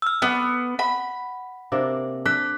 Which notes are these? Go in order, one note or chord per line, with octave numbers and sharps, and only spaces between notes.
E6 F6
B3 A4 D5
F#5 B5
C3 A#3 D4
D4 A4 D6 F#6 B6